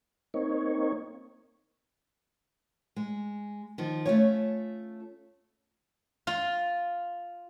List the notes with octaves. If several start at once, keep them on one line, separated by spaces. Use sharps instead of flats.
A#3 C4 D#4 C#5
G#3
D#3 F3
A3 C#4 F4 C#5
F4